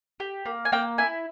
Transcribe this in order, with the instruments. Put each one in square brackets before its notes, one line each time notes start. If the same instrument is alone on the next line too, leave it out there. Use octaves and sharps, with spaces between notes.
[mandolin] G4
A#3
G#5
A#3 G5
E4 G#5